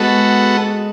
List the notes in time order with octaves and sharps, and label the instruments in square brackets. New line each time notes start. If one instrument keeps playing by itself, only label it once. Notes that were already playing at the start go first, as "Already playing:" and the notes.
Already playing: [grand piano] G#3 [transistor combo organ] B3 F#4 A4